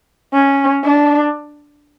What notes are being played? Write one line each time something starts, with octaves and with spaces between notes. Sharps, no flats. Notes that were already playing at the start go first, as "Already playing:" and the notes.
C#4
D4